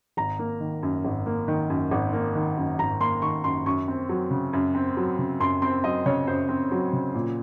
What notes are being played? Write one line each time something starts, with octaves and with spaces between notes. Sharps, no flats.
G#1 A#5
A#3
D#3
F#2
G#1
A#3
D#3
F#2
G#1
A#3
D#3
F#2
G#1 A#5
A#3 C6
D#3 C#6
F#2 C6
F#2 C#6
C4
F#3
C#3
F#2
C4
F#3
C#3
F#2 C6
C4 C6
F#3 D#5
C#3 C#5
F#2 C5
C4
F#3
C#3
A#2